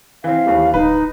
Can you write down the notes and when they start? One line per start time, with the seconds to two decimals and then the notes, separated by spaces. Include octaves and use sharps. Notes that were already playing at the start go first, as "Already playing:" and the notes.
0.24 E3 C4 F5
0.46 D#2 E3 G3
0.74 D1 D#4 B4